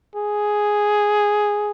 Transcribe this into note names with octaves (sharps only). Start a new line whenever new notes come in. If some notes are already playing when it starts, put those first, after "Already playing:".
G#4